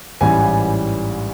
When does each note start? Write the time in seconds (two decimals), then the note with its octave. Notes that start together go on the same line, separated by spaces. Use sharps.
0.21 A1 G#2 E3 G3 G#5